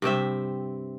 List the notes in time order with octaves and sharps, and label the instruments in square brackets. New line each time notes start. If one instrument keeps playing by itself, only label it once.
[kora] G2 C3 C4 E5